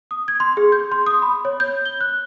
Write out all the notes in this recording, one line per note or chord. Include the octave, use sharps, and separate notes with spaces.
D#6
G#6
C6
G#4
G6
C6
D#6
B5
C#5
G6
G7
F#6